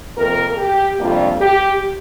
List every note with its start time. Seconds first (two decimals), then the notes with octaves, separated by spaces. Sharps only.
0.18 F2 C3 A#3 A#4
0.58 G4
0.99 F2 C3 G3 A#3 D4 F4
1.41 G4